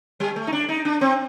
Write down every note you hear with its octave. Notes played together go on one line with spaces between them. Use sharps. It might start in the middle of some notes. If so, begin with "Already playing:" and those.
G3
A3
D#4
D4
D#4
D4
C4